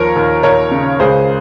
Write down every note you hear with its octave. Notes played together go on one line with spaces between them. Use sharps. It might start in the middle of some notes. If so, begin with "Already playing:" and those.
Already playing: D#2 F3 A#4 C#5
D#2
D#2 A#4 C#5
C#3
C#2 G#4 C5